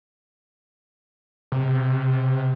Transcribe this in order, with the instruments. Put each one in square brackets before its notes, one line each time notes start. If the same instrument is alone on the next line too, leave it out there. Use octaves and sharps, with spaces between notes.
[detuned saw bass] C3